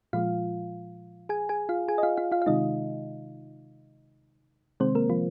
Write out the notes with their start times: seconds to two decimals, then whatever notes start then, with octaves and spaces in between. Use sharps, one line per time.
0.13 A#2 F3 G#3 F4 F5
1.29 G#4 G#5
1.49 G#4 G#5
1.69 F4 F5
1.88 G#4 G#5
1.98 D#5
2.03 F4 F5
2.17 F4 F5
2.32 F4 F5
2.42 F5
2.46 C3 D#3 G#3 D#4 D#5
4.80 C3 D#3 G#3 C4 C5
4.95 A#3 A#4
5.10 F3 F4